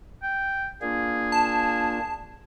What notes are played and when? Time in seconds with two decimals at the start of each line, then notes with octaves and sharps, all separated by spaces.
0.23 G5
0.82 A#3 D4 F4 G#4
1.32 A5